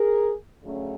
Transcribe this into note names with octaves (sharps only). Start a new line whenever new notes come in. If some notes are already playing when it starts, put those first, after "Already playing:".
Already playing: G#4 A#4
D2 C#3 F#3 A3 C#4